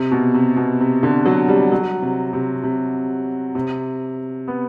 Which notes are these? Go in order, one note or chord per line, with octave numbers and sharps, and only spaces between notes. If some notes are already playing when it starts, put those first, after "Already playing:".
Already playing: C3
B2
C3
B2
C3
D3
F#3
G3
F#3
C3
C3
C3
C3
B3